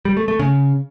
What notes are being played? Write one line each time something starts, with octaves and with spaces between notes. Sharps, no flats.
G3
A3
A3
C#3